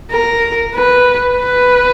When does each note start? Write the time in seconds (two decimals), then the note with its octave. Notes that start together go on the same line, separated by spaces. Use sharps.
0.12 A#4
0.74 B4
1.37 B4